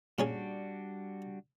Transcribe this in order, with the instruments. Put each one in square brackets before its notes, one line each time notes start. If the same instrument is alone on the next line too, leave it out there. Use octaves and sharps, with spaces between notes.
[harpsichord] A#2 C#4 G#4 [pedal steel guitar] G3 D4 F#4